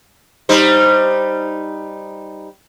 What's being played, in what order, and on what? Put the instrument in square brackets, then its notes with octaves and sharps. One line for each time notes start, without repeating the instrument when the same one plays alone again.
[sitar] G3 D#4 C5